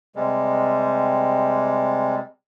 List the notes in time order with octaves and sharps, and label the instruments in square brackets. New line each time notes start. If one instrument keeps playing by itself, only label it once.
[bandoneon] C3 G3 G#3